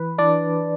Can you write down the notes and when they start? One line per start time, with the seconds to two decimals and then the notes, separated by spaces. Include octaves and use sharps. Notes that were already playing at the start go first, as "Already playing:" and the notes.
Already playing: E3 B4
0.18 E3 D4 D5